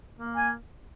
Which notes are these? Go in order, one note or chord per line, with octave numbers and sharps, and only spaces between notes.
A#3
G#5